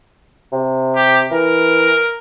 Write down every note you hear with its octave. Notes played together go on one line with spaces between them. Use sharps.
C3
G4
E3 A#4